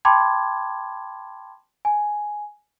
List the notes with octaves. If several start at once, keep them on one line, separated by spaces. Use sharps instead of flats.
G5 A5 B5 C6 D6 G#6
G#5